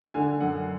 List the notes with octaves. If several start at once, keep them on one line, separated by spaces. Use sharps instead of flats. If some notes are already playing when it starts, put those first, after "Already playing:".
D3 G#5
F#2 F#5